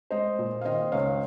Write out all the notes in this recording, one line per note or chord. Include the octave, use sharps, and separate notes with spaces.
G#3 C5 D#5
A#2
F5
D#3 C5 D#5
C#2 C#5 F5